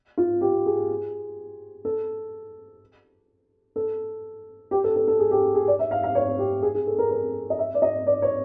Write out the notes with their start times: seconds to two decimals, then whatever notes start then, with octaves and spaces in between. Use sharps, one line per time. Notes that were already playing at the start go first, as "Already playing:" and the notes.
0.17 F4
0.41 G4
0.66 G#4
1.85 A4
3.76 A4
4.71 G4
4.84 A4
4.96 A4
5.08 A4
5.19 G#4
5.31 G4
5.55 G#4
5.68 D5
5.79 E5
5.91 F5
6.03 F5
6.15 C#5
6.39 G4
6.62 G#4
6.74 G#4
6.87 A4
6.98 A#4
7.11 A#4
7.50 D#5
7.59 E5
7.74 D5
7.82 D#5
8.07 D5
8.22 C#5